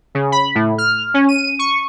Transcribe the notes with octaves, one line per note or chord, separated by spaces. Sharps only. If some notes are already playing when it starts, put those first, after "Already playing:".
C#3
B5
A2
F6
C#4
D#7
C#6